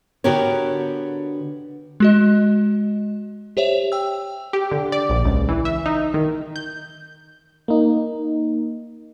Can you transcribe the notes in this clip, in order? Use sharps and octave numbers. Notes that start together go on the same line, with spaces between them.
D3 B3 F#4 G4 A#4 C#5
G#3 F#4 D#5
G4 C5 C#5 E5
G5 E6
G4
D3
D5
A#1
C#2
E3
E5
D#4
D#3
G6
A#3 D#4